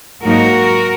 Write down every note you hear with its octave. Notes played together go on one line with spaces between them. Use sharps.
G#2 F#3 A#3 D#4 F#4 A#4